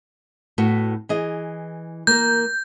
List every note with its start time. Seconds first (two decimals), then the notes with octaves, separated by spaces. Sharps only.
0.58 A2 B3 F#4
1.09 E3 G#4 D#5
2.07 A#3 A#4 G6